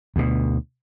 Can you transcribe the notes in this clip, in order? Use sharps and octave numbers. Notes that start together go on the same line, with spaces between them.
D2 B2